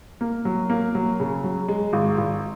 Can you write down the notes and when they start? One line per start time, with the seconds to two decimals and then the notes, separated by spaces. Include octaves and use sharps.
0.21 A#3
0.45 F#3
0.70 A#3
0.95 F#3
1.20 C#3
1.44 F#3
1.68 G#3
1.93 G#1
2.18 G#1